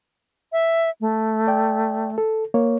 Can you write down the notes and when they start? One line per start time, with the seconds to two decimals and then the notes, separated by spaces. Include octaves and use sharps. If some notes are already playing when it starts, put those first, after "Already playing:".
0.52 E5
1.01 A3
1.47 D5 G5
2.18 A4
2.54 A#3 C#5